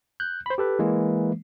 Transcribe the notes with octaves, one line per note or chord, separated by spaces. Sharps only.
F#6 G6
C5 B5
G4 A4 B4
E3 G#3 A#3